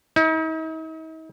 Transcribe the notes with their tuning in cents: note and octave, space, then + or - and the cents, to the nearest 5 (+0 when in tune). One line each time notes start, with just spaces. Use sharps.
D#4 +45